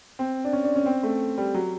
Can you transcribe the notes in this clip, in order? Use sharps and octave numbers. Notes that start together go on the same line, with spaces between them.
C4
D4
C#4
D4
C#4
C4
A3
G3
F#3